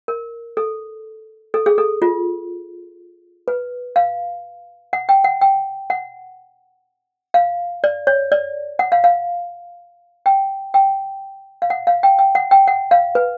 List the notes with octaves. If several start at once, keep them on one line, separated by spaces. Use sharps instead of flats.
A#4
A4
A4
G#4
A4
F4
B4
F5
F#5
G5
F#5
G5
F#5
F5
D5
C#5
D5
F#5
F5
F5
G5
G5
F5
F#5
F5
G5
G5
F#5
G5
F#5
F5
B4